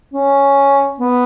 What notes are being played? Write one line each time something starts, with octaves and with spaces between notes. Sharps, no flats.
C#4
B3